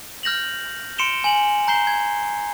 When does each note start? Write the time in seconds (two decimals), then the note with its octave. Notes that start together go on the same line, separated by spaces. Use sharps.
0.23 F6 G6 A#6 F7 F#7
0.98 C6 C#7 D7 E7 F7 G7
1.24 G#5 F#7
1.68 A#5 G6 C7 G7
1.87 G#6